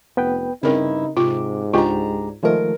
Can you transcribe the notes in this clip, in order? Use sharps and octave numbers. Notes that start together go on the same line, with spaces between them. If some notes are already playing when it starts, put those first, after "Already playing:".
F1 B3 B4 G5
G2 C#3 C4 D#4 E4 A#4
G#2 C3 F4 D6
C#2 G#3 D4 F4 G4 A#5
D#3 F3 G#3 A3 A#4